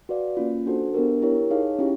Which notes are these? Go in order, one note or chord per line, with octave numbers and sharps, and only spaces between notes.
F#4 B4 D5 F5
A#3 C#4 F4
D4 F#4 A4 C5
B3 D4 G4 A#4
E4 G4 A#4 C#5
D#4 G#4 C#5 F5
C#4 E4 G4